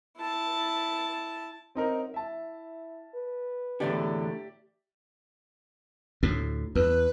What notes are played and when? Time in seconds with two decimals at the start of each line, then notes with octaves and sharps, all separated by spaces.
0.17 E4 A5
1.75 F#2 C4 D#4 A#4
2.14 E4 E5 A5
3.14 B4
3.80 E2 A2 D3 G4 D5 E5
6.23 D2 A2
6.75 E2 B4